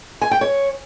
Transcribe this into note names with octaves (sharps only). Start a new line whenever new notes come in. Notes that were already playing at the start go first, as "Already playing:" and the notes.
G#5
G5
C#5